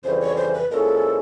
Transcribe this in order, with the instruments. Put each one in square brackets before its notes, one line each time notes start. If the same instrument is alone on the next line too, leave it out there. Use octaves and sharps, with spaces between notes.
[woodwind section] F2 C#3 E3 G3 [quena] C5
[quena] C#5
C5
B4
[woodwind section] A#2 F3 G#3 C#4 E4 [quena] A4 A#4